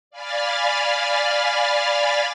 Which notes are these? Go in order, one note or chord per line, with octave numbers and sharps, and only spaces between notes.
D5 F5 G#5 B5 F6 A6